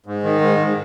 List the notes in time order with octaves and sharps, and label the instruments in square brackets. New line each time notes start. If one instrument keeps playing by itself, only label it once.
[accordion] G#2
D#3
G#2
G#2